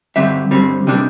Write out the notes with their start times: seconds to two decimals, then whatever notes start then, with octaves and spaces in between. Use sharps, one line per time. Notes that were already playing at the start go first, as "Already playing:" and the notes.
0.16 G2 D3 G3 C4 E5
0.51 G2 D3 G3 C4
0.87 C3 G3 D4